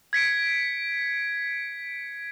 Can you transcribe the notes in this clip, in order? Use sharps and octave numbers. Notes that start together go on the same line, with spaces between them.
G#6 B6 C#7 D7